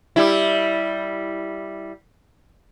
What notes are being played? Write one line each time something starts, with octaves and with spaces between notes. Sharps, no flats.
G3 E4